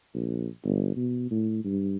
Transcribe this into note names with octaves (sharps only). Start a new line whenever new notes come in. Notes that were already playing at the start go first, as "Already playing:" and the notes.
A#1
G1
B2
A2
G2